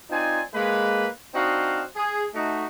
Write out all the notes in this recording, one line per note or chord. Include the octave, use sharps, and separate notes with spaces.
C4 D#4 F4 D5 G#5
G#3 A#3 B4
C4 D4 D#4 F#4 D#5 F5
G#4
A3 D#4 F#4